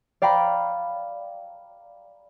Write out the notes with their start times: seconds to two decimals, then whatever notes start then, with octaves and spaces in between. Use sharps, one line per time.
0.22 D5 F5 G5 A#5 B5